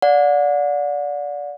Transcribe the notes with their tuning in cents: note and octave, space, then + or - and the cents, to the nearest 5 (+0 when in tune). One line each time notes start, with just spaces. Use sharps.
D5 -15 F#5 -40